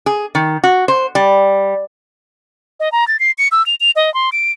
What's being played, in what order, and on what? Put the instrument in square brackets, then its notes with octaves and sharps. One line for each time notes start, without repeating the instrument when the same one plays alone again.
[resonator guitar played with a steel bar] G#4
D#3
F#4
C5
G3
[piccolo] D#5
A#5
A6
C7
C#7
E6
F7
F7
D#5
C6
D7